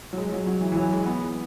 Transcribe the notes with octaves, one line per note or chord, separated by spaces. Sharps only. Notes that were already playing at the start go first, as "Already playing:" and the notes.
F#3
G#3
F#3
F#3
E3
E3
F#3
G#3
B3